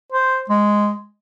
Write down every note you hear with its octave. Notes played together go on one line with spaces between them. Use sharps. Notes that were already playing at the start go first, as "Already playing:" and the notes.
C5
G#3